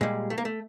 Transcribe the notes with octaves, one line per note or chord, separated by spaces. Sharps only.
A#2 G3 G#3
A3
A#3
A3